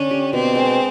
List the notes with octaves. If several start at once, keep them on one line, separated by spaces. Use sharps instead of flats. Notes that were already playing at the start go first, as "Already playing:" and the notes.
Already playing: D3 C#4 D4
G4
B2 C4
G#3